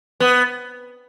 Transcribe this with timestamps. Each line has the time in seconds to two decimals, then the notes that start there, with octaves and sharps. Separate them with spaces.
0.20 B3